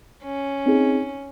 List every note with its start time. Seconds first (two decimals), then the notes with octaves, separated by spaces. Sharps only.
0.23 C#4
0.66 C4 D#4 G#4